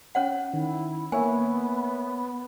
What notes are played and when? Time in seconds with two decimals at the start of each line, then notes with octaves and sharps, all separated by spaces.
0.15 C#4 C#5 F#5
0.54 D#3 E4
1.12 A#3 B3 C#5 E5 G#5